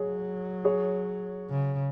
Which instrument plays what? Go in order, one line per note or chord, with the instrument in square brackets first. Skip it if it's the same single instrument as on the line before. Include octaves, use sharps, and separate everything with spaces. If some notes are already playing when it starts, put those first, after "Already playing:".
Already playing: [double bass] F#3 [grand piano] G#4 C#5
[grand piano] G#4 C#5
[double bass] C#3